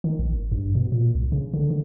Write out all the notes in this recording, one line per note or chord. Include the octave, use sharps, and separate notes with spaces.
D#3
A#1
G#1
G2
B2
A#2
C2
C#3
D3
D3